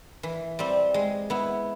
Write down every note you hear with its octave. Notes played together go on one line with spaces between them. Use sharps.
E3
G3 C4
G#3
B3 E4